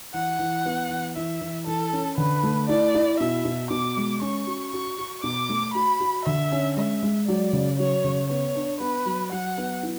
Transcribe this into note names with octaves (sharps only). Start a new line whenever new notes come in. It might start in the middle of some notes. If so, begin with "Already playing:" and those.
E3 F#5
E3
B3
E3
E3 E5
E3
E3 A4
C#4
D3 B4
A3
E4 D5
E4
B2 E5
B2
B2 D6
G#3
C#4 C#6
F#4
F#4 C#6
F#4
B2 D6
A3
F#4 B5
F#4
D3 E5
C#4
G#3 E5
G#3
F#3 D5
C#3
F#3 C#5
C#3
B3 C#5
D4
B3 B4
F#3
F#3 F#5
B3
E4